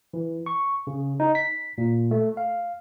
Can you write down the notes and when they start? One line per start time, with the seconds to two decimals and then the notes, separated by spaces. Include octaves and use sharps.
0.14 E3
0.46 C#6
0.87 C#3
1.20 D#4
1.35 B6
1.78 A#2
2.11 A3
2.37 F5